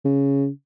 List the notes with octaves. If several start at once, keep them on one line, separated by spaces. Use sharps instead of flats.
C#3